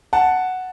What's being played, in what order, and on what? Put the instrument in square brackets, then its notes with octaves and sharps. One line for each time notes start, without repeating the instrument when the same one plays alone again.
[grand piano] F#5 A5